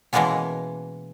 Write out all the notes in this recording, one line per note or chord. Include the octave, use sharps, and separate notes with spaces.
B2 E3 G#3 A#3 B3 C#4